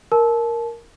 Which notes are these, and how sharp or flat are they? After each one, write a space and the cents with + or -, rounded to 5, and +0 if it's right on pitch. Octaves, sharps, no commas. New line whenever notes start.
A#4 +0 A5 -25